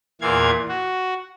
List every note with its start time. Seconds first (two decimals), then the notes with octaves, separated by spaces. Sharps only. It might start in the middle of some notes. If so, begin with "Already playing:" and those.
0.21 E2 A#2 E3 F5 G#6
0.69 F#4